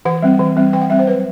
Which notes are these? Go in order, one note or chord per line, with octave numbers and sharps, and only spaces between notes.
E3 F#5
G3 C4
E3
G3 C4
E3 G5
F#5
G3 C4 E5
C5
F#3 B4